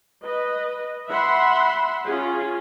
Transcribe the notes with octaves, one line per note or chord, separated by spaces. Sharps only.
B4 D#5
E5 F#5 B5 C6
C#4 F4 G#4